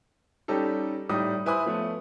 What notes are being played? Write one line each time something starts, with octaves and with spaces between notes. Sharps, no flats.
G3 C#4 D#4 G4 A4
A2 G3 D#4 D#6
E4 B4 C5 G#5 B5 D#6
F3 A3 B3 C#5